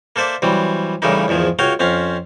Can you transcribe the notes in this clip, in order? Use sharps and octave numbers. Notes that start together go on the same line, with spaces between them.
A#3 A4 C5 D5 E5
E3 F#3 G3 C4
A2 C#3 E3 G3 A#3 D#4
E2 G#2 D#3 F3
C#2 F#4 C#5 F5 G5
F2 C4 C#4 F5